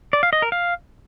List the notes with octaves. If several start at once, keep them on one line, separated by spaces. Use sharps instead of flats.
D5
F5
D#5
A#4
F5